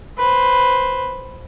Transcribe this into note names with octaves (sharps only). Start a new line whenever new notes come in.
B4 C5